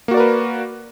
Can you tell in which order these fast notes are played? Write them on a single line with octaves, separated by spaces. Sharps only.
A#3 F#4 D5 A#4 B4